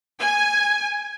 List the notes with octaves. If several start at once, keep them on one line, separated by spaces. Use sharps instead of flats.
G#5